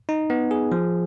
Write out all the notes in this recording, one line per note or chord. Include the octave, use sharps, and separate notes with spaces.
D#4
B3
G#4
F3